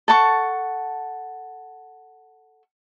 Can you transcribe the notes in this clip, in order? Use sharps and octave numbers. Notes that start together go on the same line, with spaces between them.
A4 F#5 A5 C#6